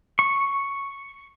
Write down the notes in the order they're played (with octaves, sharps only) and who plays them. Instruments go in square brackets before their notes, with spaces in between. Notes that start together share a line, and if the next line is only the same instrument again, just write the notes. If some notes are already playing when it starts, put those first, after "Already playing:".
[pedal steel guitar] C#6